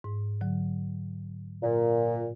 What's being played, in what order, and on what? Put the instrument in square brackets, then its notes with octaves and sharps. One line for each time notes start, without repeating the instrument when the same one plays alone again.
[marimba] G#2
D3 F#3
[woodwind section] A#2